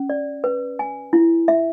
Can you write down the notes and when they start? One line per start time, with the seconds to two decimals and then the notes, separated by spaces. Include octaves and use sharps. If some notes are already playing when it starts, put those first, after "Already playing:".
Already playing: C#4
0.10 D5
0.44 B4
0.79 G#5
1.13 E4
1.48 E5